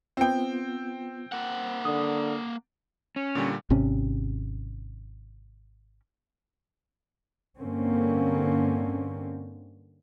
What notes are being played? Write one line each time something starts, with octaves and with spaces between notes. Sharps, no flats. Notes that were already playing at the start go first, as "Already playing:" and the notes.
B3 C4 F4 G5
A#3 F#5
D3 D#6
C#4
A#2 D3 G3
G#1 C3 C#4
G2 D3 A#3 C4 C#4